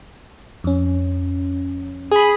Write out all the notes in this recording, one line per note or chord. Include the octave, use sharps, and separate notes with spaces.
F2 C#4
G#4 B5